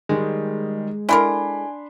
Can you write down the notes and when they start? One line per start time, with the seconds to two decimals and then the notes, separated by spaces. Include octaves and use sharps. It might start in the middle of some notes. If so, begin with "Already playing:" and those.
0.09 D#3 G3 G#3
1.09 D4 E4 A4 A#4 G#5 B5 C6